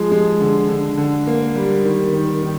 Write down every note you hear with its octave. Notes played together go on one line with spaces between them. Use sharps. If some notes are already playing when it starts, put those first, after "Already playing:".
Already playing: F3 G#3
G#3
D3
D3
D3
A#3
G3
D#3
D#3
D#3